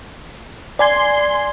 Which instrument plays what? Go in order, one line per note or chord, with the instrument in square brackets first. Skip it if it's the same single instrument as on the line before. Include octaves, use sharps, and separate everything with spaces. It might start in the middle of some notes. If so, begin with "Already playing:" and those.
[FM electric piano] D5 G#5 G#6 [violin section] C6